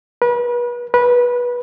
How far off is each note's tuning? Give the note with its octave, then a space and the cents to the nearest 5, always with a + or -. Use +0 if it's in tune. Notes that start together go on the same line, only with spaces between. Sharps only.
B4 -35
B4 -20